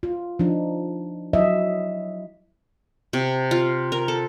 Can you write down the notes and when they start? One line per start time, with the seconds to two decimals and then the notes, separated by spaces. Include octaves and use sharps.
0.03 F4
0.39 F3 D4 D#4
1.33 F#3 E4 D#5 E5
3.13 C3
3.51 F4
3.92 A#4
4.08 A4